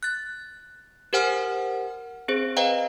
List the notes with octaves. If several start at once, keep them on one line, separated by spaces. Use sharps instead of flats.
F#6 A6
G4 A#4 C5 F#5 G#5 F6
C4 G#4 C5
B4 C5 D#5 F5 G5 A#5